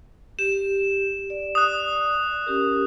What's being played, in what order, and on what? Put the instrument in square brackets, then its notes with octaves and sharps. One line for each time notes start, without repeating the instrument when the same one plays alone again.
[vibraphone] G4 [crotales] E7
[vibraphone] D5
[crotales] D#6 F#6
[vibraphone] C#4 G4 A#4